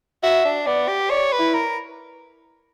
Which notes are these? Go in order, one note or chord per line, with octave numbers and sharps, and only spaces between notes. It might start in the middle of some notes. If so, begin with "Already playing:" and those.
F#4 E5
D4
B3 D5
G4
C#5 D5
B4
E4
A#4